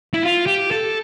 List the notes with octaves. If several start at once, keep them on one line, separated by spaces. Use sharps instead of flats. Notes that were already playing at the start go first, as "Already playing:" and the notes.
E4
F4
G4
A4